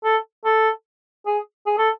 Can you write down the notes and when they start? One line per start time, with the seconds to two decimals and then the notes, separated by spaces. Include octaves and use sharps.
0.04 A4
0.45 A4
1.26 G#4
1.67 G#4
1.78 A4